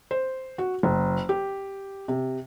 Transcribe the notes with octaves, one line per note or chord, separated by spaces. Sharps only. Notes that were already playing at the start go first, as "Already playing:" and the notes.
C5
F#4
F#1
G4
C3